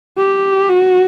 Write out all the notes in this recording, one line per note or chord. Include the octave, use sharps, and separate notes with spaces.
G4
F#4